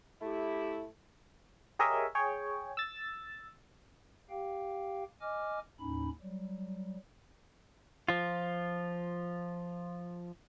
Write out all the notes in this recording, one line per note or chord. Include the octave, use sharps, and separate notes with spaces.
A3 E4 G4
G4 G#4 A#4 C#5 D#5 E5
G#4 C#5 G5
E6 A6
G4 F5 G5
D#5 G#5 D6 F6
D#2 A2 C#4 D#4 B5
F#3 G3
F3 F4